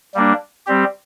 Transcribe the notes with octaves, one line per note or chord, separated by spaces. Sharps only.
G3 A#3 D4
G3 C4 G4